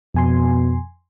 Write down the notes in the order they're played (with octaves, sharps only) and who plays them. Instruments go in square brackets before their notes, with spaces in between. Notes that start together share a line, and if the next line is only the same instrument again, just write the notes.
[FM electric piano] F2 G#5 C6 [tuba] B2